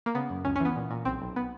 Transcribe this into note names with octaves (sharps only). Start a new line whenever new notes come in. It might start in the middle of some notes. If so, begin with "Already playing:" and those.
A#3
C#3 B3
F#2
C#2 C#4
C#4
E3
B3
A#2
A#2
B1 C4
B1
B3